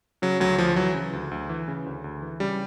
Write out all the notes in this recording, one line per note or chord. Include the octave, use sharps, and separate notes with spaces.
C#3 F#3
D2 F#3
D2 F3
E3 F#3
C#3
D2
D2
E3
C#3
D2
D2
E3
C#3 G3